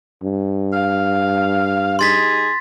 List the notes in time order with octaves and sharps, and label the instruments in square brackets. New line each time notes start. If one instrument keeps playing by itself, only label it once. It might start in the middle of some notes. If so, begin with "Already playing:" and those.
[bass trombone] G2
[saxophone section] F5
[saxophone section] G3 D#4 G#4 [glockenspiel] C6 A6 B6